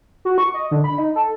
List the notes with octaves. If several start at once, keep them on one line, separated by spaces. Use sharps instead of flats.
F#4
C#6
D#5
D3
B5
D#4
A4